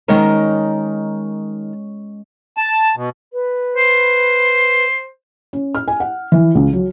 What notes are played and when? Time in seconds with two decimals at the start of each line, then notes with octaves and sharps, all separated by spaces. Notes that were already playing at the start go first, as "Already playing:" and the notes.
0.08 D#3 G#3 C#4 D#4 A#4
2.57 A5
2.96 B2
3.33 B4
3.76 C5
5.53 C#4
5.75 F6
5.88 G#5
6.00 F#5
6.32 E3
6.55 C#2
6.73 F#3